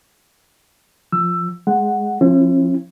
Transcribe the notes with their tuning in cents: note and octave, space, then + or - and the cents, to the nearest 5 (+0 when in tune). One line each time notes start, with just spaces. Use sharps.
F3 +0 E6 +15
G#3 +5 F#5 +0
F3 +0 C#4 -45 E4 +35